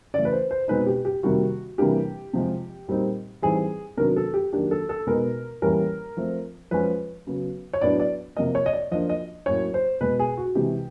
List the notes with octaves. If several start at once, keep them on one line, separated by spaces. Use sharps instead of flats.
C#3 E3 A3 D5
B4
C5
C5
B2 G#3 C4 D#4 B4
G4
G4
C3 D#3 G3 A#3 F#4
C3 E3 G3 A#3 D4 G4
C3 F3 G#3
A#2 G3 C4 D#4
A2 E3 G3 C4 D#4 G#4
C3 D#3 F#3 B3 D4 A#4
A4
G4
D#3 F#3 A#3 D4 G4
A4
A4
B2 G#3 B3 D#4 A#4
A2 E3 G3 A#3 C#4 A#4
F3 A3 C4
F3 G#3 C#4 B4
C#3 F#3 B3
C#5
A2 F#3 B3 D4 D5
D5
C3 F3 A#3 D#5
C#5
D#5
D5
F3 A#3 D4 D#5
D#5
A2 F#3 A#3 C#4 C#5
C5
B2 G#3 B3 B4
G#4
F#4
C3 E3 G#3 G4